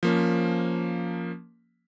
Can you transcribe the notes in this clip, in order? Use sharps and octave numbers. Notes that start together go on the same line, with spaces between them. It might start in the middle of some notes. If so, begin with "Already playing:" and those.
F3 A#3 C#4